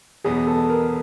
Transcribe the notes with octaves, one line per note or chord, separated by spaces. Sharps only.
E2 B2 F#3 B3 D#4 G#4
A4
A#4